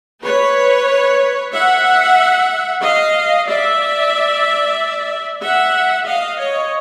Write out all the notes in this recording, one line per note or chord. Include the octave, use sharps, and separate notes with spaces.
B4 C#5
E5 F#5
D#5 F5
D5 E5
E5 F#5
D#5 F5
C#5 D#5